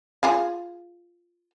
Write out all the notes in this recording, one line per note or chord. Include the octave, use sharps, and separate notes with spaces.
F4 G#4 F5